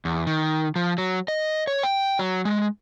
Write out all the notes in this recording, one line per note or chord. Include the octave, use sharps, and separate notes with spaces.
E2
D#3
F3
F#3
D#5
C#5
G5
F#3
G#3